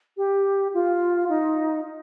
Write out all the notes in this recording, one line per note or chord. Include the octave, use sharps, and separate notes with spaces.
G4
F4
D#4